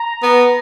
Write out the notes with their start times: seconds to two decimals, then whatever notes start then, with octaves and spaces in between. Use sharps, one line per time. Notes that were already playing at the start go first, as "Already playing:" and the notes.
Already playing: A#5
0.23 B3